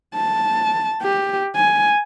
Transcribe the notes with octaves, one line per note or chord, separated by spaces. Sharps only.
A5
G4
G#5